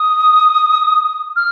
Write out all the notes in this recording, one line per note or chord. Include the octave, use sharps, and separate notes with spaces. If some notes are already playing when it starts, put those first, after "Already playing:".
Already playing: D#6
F6